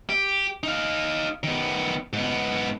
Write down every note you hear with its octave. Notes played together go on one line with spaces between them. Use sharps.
G4
D#4 F5
D#3 B3
G#2 B3